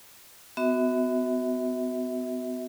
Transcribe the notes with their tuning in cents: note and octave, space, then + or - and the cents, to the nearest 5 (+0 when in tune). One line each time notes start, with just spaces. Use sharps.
B3 +30 F#4 +0 E5 -30